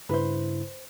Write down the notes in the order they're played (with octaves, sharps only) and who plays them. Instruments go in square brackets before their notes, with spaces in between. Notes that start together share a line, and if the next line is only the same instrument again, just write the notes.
[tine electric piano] G2 C#3 E4 [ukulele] B4 C5